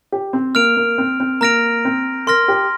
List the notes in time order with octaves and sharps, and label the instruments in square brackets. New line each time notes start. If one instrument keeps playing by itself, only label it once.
[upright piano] G4
C4
[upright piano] A#3 [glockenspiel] F6 D7 F7
[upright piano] A#3
C4
C4
[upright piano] A#3 [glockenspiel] A#5 F6 A#6 D7 F7
[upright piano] C4
[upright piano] A#4 [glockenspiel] C6 F6 A#6
[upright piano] G4